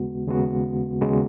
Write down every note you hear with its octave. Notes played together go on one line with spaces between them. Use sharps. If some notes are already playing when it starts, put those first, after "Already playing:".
Already playing: D#2 C#3 G#3 B3 F#4
D#2 C#3 G#3 B3 F#4
D#2 C#3 G#3 B3 F#4